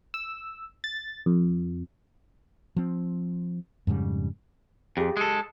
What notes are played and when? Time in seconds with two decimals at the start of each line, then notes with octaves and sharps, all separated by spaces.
0.14 E6
0.84 A6
1.26 F2
2.76 F3 C4
3.87 F2 G#2 C#3 G3
4.97 F2 G4 G#4
5.17 G#3 A4